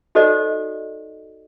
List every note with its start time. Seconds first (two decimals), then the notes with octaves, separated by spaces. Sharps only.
0.15 D#4 F#4 A4 C5 D5 D#5